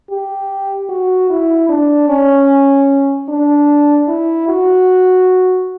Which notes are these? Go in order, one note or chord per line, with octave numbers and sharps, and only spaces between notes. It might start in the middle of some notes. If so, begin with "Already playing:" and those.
G4
F#4
E4
D4
C#4
D4
E4
F#4